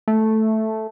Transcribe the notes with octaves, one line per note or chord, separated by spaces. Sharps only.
A3